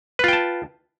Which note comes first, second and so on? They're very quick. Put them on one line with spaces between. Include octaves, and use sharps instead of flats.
B4 F4 G5 A5